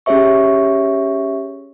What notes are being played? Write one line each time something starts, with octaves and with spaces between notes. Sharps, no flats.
C#4 G4 G#4 C#5 E5 C#6